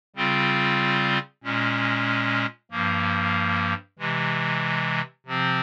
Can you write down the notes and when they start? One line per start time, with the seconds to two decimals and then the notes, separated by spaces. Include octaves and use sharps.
0.16 C#3 G3 C4 F4
1.44 A#2 G#3 C#4
2.71 G2 F3 A#3
3.99 C3 E3 G#3
5.26 C3 F3 C4